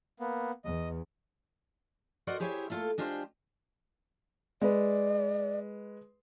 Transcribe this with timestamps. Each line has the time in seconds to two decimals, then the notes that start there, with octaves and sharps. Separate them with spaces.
0.20 A#3 B3
0.65 E2 E3 D#5
2.27 F#4 A#4 C5 D5 D#5 F#5
2.40 E4 G4 G#4 C5 C#5 E5
2.70 A3 A#3 F4 G4 A4
2.98 G#3 D4 F4 G4 B4 C5
4.62 G#3 B4 D5